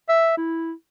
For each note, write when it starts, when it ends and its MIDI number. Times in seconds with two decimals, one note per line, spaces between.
0.09 0.33 76
0.37 0.72 64